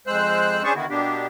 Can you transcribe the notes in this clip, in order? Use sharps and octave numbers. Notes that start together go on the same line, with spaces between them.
F2 G#3 C5 E6 F#6
C#4 D4 G#4 C5 A5 C#6
D3 D#3 B3 E4 F#4
B2 A#3 B3 D4 G4